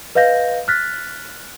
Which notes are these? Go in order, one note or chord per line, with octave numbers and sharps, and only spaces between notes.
B4 D#5 F5 G6 A#6
F6 F#6 A6 B6